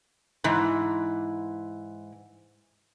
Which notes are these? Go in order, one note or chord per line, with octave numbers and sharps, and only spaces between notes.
G#2 E3